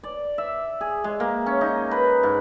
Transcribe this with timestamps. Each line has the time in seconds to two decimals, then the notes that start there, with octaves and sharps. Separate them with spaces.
0.03 D5
0.38 E5
0.81 G#4
1.04 G#3
1.20 A#3
1.46 C#4
1.61 D#4
1.91 B4
2.23 G#2